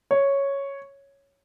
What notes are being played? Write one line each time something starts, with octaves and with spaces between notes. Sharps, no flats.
C#5